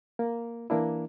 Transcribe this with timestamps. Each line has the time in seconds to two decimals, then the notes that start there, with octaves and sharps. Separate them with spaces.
0.19 A#3
0.70 E3 A#3 D4 E4